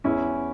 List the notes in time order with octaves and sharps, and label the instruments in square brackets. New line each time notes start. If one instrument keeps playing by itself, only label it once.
[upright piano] E2 C#4 E4